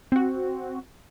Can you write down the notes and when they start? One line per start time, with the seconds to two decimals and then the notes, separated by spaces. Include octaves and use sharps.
0.12 C4 F#4